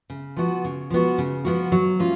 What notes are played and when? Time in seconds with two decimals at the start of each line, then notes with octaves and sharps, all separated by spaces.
0.10 C#3
0.37 F3 B3 F#4
0.65 C#3
0.90 F3 B3 F#4
1.18 C#3
1.45 F3 B3 F#4
1.72 F#3
1.99 A#3 C#4 F4